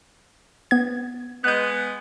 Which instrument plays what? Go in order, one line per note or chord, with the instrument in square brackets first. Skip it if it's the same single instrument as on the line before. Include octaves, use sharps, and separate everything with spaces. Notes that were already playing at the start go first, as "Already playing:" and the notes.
[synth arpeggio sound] B3 G#6
[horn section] G#3 B3 [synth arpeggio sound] F#6 G6